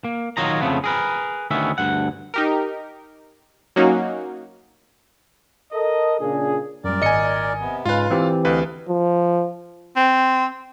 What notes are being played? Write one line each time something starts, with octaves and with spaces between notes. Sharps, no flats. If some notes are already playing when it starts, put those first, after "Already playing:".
A#3
D#3 F#3 F4 C#5 D#5 A#5
F2 G#2 C#3 F3 A3 B3
G#4 A#4 B4
D2 D#3 B3 C#4 E5
D2 G2 F#5
D#4 G4 A#4
F#3 A#3 C#4 D#4 F#4
A4 A#4 D#5
A#2 C#3 D4 F4 G#4
F#2 A#2 G3 A#4 D5
G#1 D#5 G#5 C#7
C3 B3
G#2 C#3 G#3 F4 B4 F5
A#2 E3 C4 G4
D2 B4 D#5 F5
F3
C4